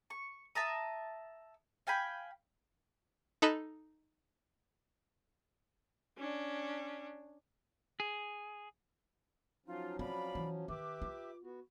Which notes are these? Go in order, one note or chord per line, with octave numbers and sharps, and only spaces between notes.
C#6
E5 A5 A#5 D#6
F5 G5 G#5 B5
D#4 A4 D#5 B5 F#6 E7
C#4 D4
G#4
F3 F#3 C#4 D#4 F4
C4 D5 F5 B5
E3
D#3 G4 B4 E5 D6
F4
B3 F#4